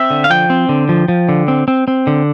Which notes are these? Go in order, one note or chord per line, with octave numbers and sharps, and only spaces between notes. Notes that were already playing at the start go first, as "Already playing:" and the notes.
Already playing: C4 E5
D3
F5
F3 G5
C4
D3
F3
F3
D3
C4
C4
C4
D3